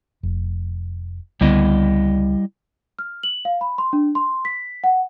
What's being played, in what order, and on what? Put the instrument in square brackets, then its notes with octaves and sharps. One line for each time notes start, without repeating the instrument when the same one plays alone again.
[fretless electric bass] F1
[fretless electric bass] C#2 D3 B3 [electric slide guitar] G3 E4 D#5
[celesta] F6
F#7
F5
B5
C6
D4
C6
B6
F#5